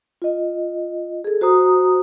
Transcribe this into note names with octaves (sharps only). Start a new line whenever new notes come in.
F4 D#5
G#4 A4
F#4 C5 A#5 D#6